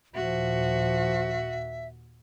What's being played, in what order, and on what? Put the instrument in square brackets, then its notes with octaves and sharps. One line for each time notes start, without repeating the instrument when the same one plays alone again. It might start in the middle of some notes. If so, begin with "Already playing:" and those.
[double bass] D#2 A#2 [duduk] F3 [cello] F#4 [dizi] E5